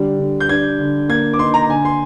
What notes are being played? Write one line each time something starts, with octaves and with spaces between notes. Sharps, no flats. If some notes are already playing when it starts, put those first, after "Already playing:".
Already playing: D3 G3
D3
G6
D4 G#6
D3
A#3 G#6
D6
D#4 C6
A#5
D3 G#5
C6